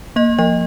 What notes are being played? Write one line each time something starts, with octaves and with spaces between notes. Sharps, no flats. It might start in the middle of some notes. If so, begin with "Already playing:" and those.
A#3 D#5
F3 D#5